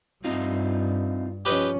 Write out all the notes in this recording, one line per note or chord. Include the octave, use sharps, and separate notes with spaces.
G2 C4 D#4 F4
F3 C#4 G4 B4 D#5